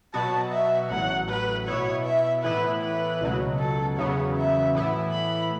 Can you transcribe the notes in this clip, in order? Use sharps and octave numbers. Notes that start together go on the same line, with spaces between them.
B2 F#3 B3 F#4 A5
E5
A1 A2 F#3 F#5
B4
B2 B3 E4 C#5
E5
A2 E3 B3 E4 B4
B4
C#2 B2 F#3
A4
E2 C#3 F#3 B3 C#5
E5
A2 E3 B3 E4
B5